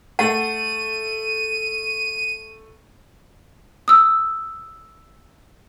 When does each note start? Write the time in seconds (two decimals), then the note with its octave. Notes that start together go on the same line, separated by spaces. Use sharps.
0.19 A3 F#5 D#7
3.88 D#6 E6